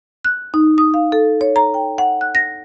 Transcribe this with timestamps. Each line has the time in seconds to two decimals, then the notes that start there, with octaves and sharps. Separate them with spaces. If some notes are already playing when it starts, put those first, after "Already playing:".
0.25 F#6
0.54 D#4
0.78 D#6
0.94 F5
1.12 A4
1.41 C#5
1.56 A#5
1.74 G5
1.98 F#5
2.21 F#6
2.35 A#6